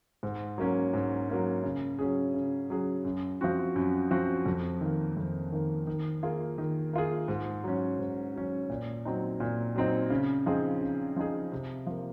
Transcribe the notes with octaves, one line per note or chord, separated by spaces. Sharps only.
G#2
F#3 A#3 C#4
G#2
F#3 A#3 C#4
C#3
F#3 C#4 G#4
C#3
F#3 C#4 G#4
F#2
F3 C4 F#4
F#2
F3 C4 F#4
F2
D#3 A#3
F2
D#3 A#3
D#3
A#3 F4 G#4
D#3
A#3 F4 G#4
G#2
F#3 C#4
G#2
F#3 C#4
A#2
F#3 C4 D#4
A#2
F#3 C4 D#4
C#3
F3 C4 D#4 G#4
C#3
F3 C4 D#4 G#4
C3
F3 A#3